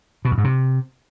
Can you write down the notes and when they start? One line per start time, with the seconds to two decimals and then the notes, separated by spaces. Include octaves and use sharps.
0.25 B2
0.31 E2
0.38 G#2
0.44 C3